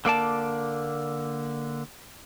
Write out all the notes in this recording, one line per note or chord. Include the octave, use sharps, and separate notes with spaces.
D3 A#3 D5 A5